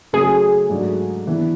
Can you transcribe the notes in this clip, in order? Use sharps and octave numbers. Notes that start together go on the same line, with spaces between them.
C#3 F#3 A3 C#4 G#4
G#2 F#3 A3 D4
E3 B3 D4